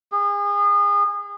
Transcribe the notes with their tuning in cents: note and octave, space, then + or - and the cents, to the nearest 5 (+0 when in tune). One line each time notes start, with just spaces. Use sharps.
G#4 -35